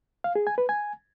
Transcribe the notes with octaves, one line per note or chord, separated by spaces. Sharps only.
F5
G#4
G#5
B4
G#5